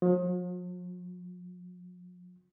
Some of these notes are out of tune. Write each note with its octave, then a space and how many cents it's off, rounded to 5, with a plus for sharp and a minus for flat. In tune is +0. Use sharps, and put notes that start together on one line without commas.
F3 +45